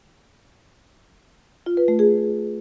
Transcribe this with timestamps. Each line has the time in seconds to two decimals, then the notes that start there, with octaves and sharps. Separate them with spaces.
1.66 F4
1.77 B4
1.88 A3
1.99 G#4